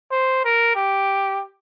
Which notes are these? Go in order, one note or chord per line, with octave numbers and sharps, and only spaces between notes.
C5
A#4
G4